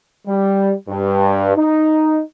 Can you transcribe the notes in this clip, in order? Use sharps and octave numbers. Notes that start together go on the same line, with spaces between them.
G3
G2
D#4